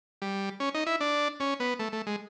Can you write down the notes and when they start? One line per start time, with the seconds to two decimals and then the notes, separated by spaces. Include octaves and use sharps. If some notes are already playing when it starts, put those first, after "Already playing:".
0.22 G3
0.60 C#4
0.74 D#4
0.87 E4
1.01 D4
1.40 C#4
1.60 B3
1.79 A3
1.92 A3
2.07 G#3